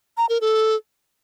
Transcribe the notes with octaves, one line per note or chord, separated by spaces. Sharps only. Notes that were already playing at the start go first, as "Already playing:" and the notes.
A#5
A#4
A4